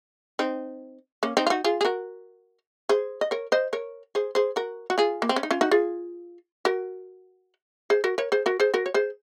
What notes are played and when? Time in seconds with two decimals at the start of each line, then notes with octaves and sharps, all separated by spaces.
0.39 C4 D#4
1.23 A#3 C#4
1.37 C4 D#4
1.47 F4
1.50 D#4 F#4
1.64 F4 G#4
1.81 G#4
1.85 F#4 A#4
2.89 G#4 C5
3.21 D#5
3.31 A#4 C#5
3.52 C5 D#5
3.73 A#4 C#5
4.15 G#4 C5
4.35 G#4 C5
4.56 F#4 A#4
4.90 F#4
4.98 F4 G#4
5.22 A#3
5.29 C4
5.36 C#4
5.43 D#4
5.51 C#4 F4
5.61 D#4 F#4
5.71 F4 G#4
6.65 F#4 A#4
7.90 G#4 C5
8.04 F#4 A#4
8.18 A#4 C#5
8.32 G#4 C5
8.46 F#4 A#4
8.60 G#4 C5
8.74 F#4 A#4
8.86 C#5
8.94 G#4 C5